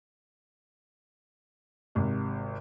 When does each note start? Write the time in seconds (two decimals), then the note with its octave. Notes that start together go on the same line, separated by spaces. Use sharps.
1.95 G#1 C3